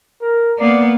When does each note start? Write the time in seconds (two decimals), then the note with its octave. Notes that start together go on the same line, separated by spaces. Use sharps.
0.21 A#4
0.59 A#3 B3 D5